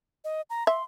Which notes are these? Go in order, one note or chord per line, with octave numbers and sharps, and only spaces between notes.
D#5
A#5
E5 C6